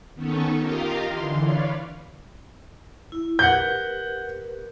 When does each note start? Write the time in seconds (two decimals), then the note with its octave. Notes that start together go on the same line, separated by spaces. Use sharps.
0.15 D#3 B3 C#4 D#4 A4 C#5
0.57 F4 G4 A#4 D#5 F5
1.04 D3 E3 C6
1.39 B4 C#5 D5 F5
3.12 E4
3.39 G4 A#4 B4 F#5 G6